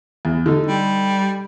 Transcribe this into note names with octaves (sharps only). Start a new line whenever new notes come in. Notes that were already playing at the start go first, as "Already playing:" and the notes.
E2
D3 D#4
G3